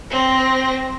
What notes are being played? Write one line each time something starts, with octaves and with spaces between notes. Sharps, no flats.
C4 A#6